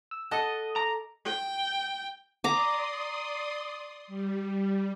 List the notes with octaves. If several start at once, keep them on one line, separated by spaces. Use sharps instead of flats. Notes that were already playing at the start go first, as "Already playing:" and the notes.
E6
A4 D#5 F#5 A5 D#6
A#5 D6
G5
D5 A#5 C6 D6 D#6
G3